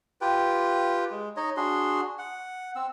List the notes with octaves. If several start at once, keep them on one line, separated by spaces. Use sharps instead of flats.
F4 G4 B4 G5
G#3
D#4 C#5 D#5
D4 F#4 G#4 C6
F#5
C4 E6